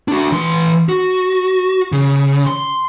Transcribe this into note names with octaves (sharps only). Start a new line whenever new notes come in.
D4 F#4
E3 C6
F#4
C#3
C6